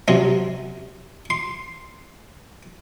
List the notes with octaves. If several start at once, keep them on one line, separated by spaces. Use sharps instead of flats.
C3 F#3 C4 C#4
C6